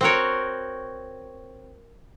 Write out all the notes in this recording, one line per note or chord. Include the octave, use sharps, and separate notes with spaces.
C4 F#4 A#4 C#5